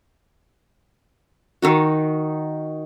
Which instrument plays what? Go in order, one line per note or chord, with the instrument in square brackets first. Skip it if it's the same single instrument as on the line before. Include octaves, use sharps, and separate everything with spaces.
[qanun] D#3 D#4 F#4